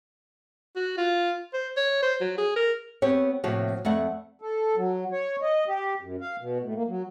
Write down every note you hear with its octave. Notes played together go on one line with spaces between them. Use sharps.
F#4
F4
C5
C#5
C5
F#3
G#4
A#4
B3 C4 G4 C#5
A2 C3 F3 A#3 F#4 C#5
F2 A3 D5 F#5
A4
F#3
C#5
D#5
G4
F#2
F5
B2
A2
A#3
F#3